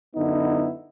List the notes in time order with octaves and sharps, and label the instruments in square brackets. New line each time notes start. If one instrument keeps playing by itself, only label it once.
[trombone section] F#2 D3 B3 D#4 E4